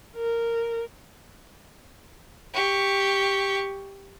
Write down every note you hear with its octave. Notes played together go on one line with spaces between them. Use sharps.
A#4
G4 C#6